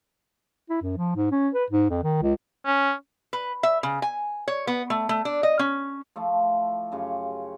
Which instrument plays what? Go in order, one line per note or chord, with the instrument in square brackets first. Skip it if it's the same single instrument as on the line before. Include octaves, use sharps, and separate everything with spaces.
[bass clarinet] E4
F#2
F3
G#2
C#4
B4
G#2
F2
D#3
C#2
[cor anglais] C#4
[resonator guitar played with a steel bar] B4
E5
C#3
G#5
C#5
B3
A3
A3
D4
D#5
C#4
[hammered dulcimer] F3 A3 E4 F4
F#2 C#3 F4 G4